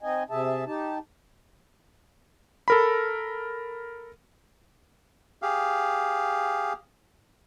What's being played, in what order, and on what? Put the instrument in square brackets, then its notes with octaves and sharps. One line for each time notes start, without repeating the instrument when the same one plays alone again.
[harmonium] C4 D#4 D#5 G#5
C3 G#4 E5 A5
D#4 G4 A5
[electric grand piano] A4 A#4 B5
[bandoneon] G4 G#4 F5